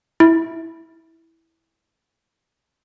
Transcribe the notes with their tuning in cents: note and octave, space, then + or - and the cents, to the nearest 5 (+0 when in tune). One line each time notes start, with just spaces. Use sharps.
E4 -10